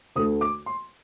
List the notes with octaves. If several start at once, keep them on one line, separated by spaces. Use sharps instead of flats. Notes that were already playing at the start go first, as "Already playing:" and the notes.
D2 D3 A3 D#6
D6
C6